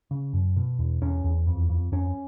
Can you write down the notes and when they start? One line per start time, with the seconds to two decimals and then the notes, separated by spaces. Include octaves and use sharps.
0.11 C#3
0.33 F#2
0.56 B2
0.79 E2
1.01 E2 C#4
1.24 E2
1.47 F2
1.69 F2
1.92 F2 C#4